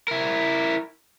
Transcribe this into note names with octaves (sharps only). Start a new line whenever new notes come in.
E4 A#4